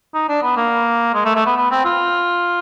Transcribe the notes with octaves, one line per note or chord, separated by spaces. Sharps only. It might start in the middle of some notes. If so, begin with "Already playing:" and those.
D#4
D4
B3
A#3
G#3
A3
A3
B3
B3
C4
F4